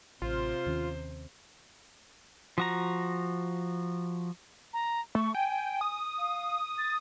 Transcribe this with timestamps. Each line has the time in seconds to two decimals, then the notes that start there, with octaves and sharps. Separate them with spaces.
0.22 A1 C3 F4 C5
0.66 D#2 D#3 C#4
2.58 F3 F#4 A#5
4.73 A#5
5.15 A3 C#6
5.35 G5 G#5
5.81 D#6
6.18 F5
6.78 A6